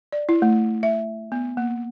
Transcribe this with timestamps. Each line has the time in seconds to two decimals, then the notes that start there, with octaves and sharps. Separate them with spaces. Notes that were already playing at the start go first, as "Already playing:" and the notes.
0.12 D5
0.29 E4
0.42 A3
0.83 E5
1.32 B3
1.57 A#3